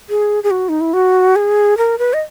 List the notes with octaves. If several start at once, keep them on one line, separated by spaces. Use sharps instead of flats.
G#4
G#4
F#4
D#4
E4
F#4
G#4
A#4
B4
D#5